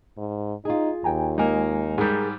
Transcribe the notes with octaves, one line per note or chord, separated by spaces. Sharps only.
G#2
D#4 F4 G#4
D#2 G5 G#5 A#5
G#3 A#3 D#4 D#5 G#5
G#2 G3 G#4 A#4